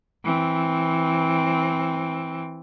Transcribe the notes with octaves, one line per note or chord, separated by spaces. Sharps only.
E3 C4